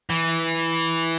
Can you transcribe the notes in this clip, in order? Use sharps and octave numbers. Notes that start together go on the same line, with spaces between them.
E3